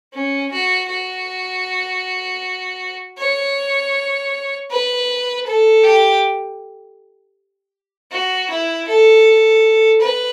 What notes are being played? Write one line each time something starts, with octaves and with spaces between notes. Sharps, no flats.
C#4
F#4
F#4
C#5
B4
A4
G4
F#4
E4
A4
B4